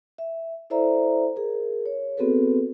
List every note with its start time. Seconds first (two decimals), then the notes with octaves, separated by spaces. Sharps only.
0.18 E5
0.70 E4 A4 C5 D5 E5 A#5
1.36 G#4 A#4
1.86 C#5
2.17 B3 C4 F#4 G#4 A4 B4